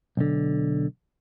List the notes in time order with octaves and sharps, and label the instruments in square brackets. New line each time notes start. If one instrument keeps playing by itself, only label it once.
[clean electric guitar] B1 D3